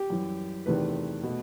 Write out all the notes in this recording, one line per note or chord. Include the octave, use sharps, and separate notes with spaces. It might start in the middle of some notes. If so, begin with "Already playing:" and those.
Already playing: G4
F#2 E3 G3
E2 C3 D#3 A3 B4
B2 A3